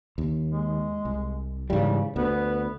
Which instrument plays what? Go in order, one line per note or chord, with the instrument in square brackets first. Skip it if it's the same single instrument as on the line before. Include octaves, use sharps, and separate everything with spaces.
[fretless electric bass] D#2
[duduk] G#3
[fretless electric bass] C2
[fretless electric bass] G#2 E3 G3 [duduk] C#3
[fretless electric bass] D2 [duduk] B3